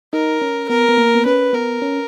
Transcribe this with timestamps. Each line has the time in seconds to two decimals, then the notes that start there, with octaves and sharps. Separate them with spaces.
0.12 D#4 A#4
0.41 C#4
0.69 B3 A#4
0.89 B3
0.98 A#3
1.15 B3
1.25 C#4 B4
1.53 B3 A#4
1.82 C#4